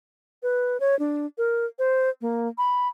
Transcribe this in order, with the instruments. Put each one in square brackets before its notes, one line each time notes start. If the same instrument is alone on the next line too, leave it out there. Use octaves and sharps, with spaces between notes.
[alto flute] B4
C#5
D4
A#4
C5
A#3
B5